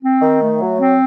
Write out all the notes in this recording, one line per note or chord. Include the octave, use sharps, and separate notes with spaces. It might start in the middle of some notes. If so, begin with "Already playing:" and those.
C4
D#3
A3
F#3
C4